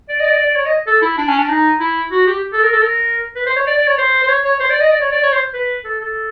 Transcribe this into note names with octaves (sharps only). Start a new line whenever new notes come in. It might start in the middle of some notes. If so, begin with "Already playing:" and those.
D5
D#5
D5
D#5
D5
D5
C#5
D#5
A4
E4
D4
C#4
D4
D#4
E4
F#4
G4
A4
A#4
A4
A#4
B4
C5
C#5
D5
D5
C#5
C5
C5
C#5
C#5
C5
D5
D#5
D5
C#5
D5
C#5
C5
B4
A4
A4